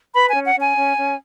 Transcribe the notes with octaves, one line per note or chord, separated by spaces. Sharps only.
B4 B5
G#5
C#4
F#5
C#4
G#5
C#4
C#4